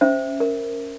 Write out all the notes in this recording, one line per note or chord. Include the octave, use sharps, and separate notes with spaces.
C#4 C5 E5
A#4